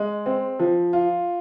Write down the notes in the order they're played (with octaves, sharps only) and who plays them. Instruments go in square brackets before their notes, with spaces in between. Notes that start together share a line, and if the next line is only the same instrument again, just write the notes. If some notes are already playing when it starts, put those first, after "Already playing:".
Already playing: [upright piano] G#3
C4
F3
F4